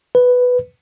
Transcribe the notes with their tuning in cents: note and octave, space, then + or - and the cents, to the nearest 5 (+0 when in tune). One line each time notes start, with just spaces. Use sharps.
B4 +5